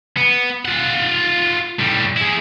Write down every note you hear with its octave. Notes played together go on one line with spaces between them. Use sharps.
B3
F4 F#5
A2 G3
E4 G#4